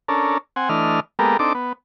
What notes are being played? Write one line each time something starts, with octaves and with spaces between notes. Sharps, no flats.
C#4 D4 A4 A#4
C4 F#5 G#5
E3 A3 D4 D#5 F6
G#3 A#3 B3 G4 A4 A#4
C4 D4 D#4 A4 D6
B3